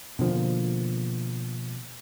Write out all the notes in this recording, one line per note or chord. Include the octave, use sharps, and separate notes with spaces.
B2 D3 F3 A#3